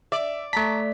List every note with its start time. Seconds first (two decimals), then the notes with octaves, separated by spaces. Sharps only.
0.12 D5 E5
0.53 A3 A5 A#5 C#6 B6